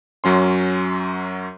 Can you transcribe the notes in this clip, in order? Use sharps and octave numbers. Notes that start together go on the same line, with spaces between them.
F#2 F#3 C#4 C6